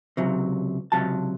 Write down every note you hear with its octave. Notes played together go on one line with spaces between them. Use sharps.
C#2 C3 F#3
C#2 C3 F#3 A5